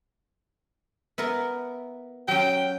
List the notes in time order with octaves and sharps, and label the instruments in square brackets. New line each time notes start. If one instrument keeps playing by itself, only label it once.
[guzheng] B3 E4 A#4
[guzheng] F#3 C#4 [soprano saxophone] G5